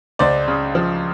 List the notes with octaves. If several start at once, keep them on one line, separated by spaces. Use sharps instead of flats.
C#2 C5 D5
C#3
F3